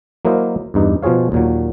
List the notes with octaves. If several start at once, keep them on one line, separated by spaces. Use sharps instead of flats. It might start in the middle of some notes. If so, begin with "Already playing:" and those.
F#3 A#3 E4 A#4 C5 D#5
E2 G2 D#4
B2 F3 F4 G#4 C#5 F5
D#2 A#2 F#3